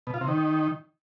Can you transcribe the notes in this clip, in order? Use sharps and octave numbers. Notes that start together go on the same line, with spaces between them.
B2
F4
C3
D#3